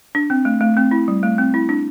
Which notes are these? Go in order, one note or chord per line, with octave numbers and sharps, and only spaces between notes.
D4
C4
A3
A3
C4
E4
G3
A3
C4
E4
D4